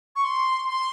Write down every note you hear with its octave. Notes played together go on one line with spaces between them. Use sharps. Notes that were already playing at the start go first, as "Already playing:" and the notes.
C#6
C6
C6